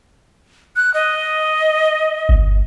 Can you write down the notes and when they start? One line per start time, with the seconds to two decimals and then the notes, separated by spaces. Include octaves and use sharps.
0.76 F#6
0.94 D#5
2.29 G1